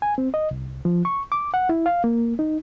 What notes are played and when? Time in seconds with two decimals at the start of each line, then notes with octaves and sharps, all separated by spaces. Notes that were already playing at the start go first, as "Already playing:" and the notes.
0.02 G#5
0.18 C4
0.34 D#5
0.51 C2
0.85 F3
1.05 C#6
1.32 D6
1.54 F#5
1.69 E4
1.86 F5
2.04 A#3
2.39 D#4